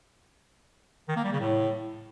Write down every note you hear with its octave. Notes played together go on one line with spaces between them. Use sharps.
D#3
A#3
G3
C#3
A2